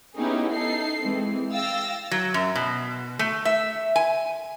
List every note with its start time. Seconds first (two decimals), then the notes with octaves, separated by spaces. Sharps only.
0.17 B3 C#4 D#4 E4 G4 G#4
0.52 D#4 A4 C7
1.02 E3 G#3 C4
1.51 F5 G5 E6 A6 A#6
2.11 F#3
2.34 F#2
2.55 B2
3.19 A3
3.45 E5
3.96 G#5